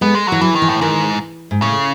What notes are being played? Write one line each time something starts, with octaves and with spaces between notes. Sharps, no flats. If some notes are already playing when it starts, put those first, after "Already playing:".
G#3 B3
G#3
E3 F#3
E3 F#3
D#3
E3
A2
G#2 D#3
G#2
A2 C#3